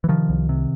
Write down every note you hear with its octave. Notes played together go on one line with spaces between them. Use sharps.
E3
C3 D#3 F3
C2
C3